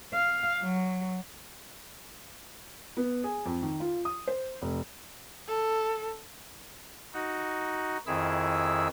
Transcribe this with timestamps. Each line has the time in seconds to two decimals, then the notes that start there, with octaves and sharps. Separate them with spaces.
0.14 F5
0.62 F#3
2.97 B3
3.24 G#4
3.45 F2
3.62 D#3
3.80 F4
4.05 D#6
4.28 C5
4.62 F1
5.48 A4
7.14 D#4 F#4
8.07 F2 D#3 E4 G#4 E6